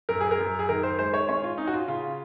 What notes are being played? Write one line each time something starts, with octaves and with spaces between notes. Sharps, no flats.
F#2 A#4
G#4
A#4
F#2
G#4
D#3 A#4
C5
G#3 C5
C#5
C#4 C#5
F4
C#4 D#4
F#4
F4
C#3 F4